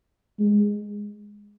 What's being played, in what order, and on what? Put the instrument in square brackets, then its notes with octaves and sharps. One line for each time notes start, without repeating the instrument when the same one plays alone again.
[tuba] G#3